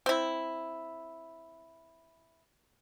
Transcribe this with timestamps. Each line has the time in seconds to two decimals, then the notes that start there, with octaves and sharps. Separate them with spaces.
0.06 C4 E4